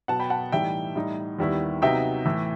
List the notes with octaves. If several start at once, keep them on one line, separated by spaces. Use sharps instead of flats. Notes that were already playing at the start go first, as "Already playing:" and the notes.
B2 F#3 B3 F#5 A5
G5 B5
F#5 A5
A2 E3 G3 D#4 E5 G5
A2 G3 D#4
D#2 D#3 G3 B3 E4
C3 F#3 B3 D#4 E5 G5
A2 E3 A3